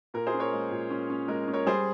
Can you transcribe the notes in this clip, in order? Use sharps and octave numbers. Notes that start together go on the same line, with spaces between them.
A#2 A#4
G#4 C5
C#4
A#4 C#5
G#3
A#2
C#4
C#4
G#3 A#4
C#4
A#4 C#5
G3 G#4 C5